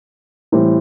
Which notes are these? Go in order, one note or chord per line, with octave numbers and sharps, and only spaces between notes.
A2 E3 G3 C4